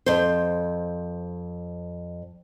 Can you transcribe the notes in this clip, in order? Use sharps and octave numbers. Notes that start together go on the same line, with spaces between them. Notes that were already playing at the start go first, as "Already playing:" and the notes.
F2 C5